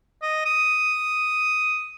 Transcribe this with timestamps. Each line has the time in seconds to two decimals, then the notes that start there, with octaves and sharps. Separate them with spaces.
0.22 D#5
0.46 D#6